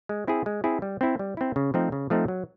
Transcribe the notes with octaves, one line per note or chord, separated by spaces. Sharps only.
G#3
C4 E4 G#4
G#3
C4 E4 G#4
G3
C4 E4
G3
C4 E4
C#3
F3 A3 C4 D#4
C#3
F3 A3 C4 D#4
F#3